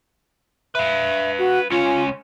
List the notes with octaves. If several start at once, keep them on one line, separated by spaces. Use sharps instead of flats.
B4 E5 F5
F#4
C#2 C#4 F4